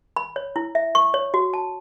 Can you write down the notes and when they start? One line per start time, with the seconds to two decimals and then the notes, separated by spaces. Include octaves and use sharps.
0.16 B5
0.36 C#5
0.56 E4
0.75 E5
0.95 C#6
1.14 C#5
1.34 F#4
1.54 A5